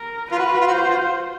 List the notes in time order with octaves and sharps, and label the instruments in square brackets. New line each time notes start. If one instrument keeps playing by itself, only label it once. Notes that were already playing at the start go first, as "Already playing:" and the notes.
Already playing: [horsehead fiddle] A#4
[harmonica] F4 [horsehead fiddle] B4
[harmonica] F#4
F4
F#4
F4
F#4
[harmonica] F4 [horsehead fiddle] C5
[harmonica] F#4
F4